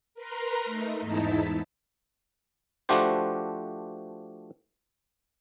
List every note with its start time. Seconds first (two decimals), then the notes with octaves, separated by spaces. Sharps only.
0.14 A#4 B4 A#5 C6
0.65 A3 D#4
1.00 E2 G#2 D#4 E4 A5 B6
2.89 F3 A3 D4 F#4 G4 C5